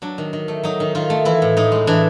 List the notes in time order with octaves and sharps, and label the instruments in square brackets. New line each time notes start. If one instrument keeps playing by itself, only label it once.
[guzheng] F#3 D4
D#3
D#3
A3
F#3 D#4
D#3
D#3 F4
A3
E3 E4
A2
A2 D#4
G#3
E3 D4